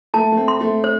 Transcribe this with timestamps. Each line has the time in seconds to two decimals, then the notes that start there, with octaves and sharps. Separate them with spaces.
0.14 A3 A5
0.32 A3
0.37 C4
0.48 C6
0.61 A3
0.84 C5